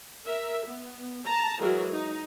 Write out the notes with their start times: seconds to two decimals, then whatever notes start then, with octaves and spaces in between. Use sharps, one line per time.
0.24 A#4 E5
0.65 B3
1.26 A5 A#5
1.60 E3 F#3 G#3 A#4
1.91 D#4